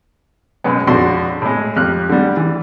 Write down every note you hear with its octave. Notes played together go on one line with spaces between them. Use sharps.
F#2 B2 G#3 B3
A#1 F2 D4 F#4 C6
A2 G#3
F2 G4 F6 F#6
D3 G3
E3